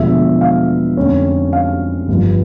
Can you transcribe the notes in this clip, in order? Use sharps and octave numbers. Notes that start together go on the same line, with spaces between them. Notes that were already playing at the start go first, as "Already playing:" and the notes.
Already playing: E1 E2 D3 F3 A3 E5
F5
F2 D3 A3 C#4
F5
G1 G2 F3